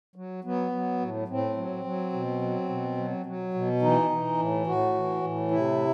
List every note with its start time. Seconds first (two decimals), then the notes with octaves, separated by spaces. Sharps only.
0.16 F#3
0.44 F#3 B3
0.72 F#3
1.00 A2
1.28 A2 C4
1.57 F#3
1.84 F#3
2.13 B2
2.42 F#3
2.69 B2
2.97 F#3
3.26 F#3
3.54 B2
3.81 E3 D#4
4.11 E3
4.38 A2
4.66 A2 F#4
4.94 E3
5.23 A2
5.51 C3 E4